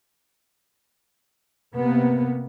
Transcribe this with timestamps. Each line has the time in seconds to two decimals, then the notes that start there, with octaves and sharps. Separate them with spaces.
1.74 C3 A#3 B3